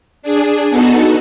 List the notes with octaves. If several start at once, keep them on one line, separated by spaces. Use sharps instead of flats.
D4 G#4
B3 D#4 F#4 A4